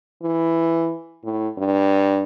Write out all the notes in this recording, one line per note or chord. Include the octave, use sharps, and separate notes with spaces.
E3
A2
G2